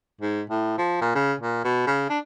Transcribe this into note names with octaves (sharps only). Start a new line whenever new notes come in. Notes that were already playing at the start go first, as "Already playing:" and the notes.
G#2
A2
F3
A#2
C#3
A#2
B2
C#3
D4